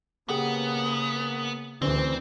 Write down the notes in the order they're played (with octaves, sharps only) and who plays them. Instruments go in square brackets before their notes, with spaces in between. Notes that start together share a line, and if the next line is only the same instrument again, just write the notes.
[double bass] C#3 A#3 [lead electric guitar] B3 [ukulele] G4 G#4 F#5
[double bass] D2 E3 [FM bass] D3 [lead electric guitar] C4 [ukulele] C#4 G#4 C5